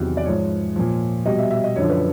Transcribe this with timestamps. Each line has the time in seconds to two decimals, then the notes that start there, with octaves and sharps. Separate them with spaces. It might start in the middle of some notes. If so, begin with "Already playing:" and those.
Already playing: E2 C3 D#3 F#3
0.17 D5
0.25 G#2 F3 C#5
0.76 A#2 F3
1.26 B2 G3 D#5
1.38 E5
1.51 E5
1.64 D#5
1.76 F#2 D3 F3 C#5
1.89 B4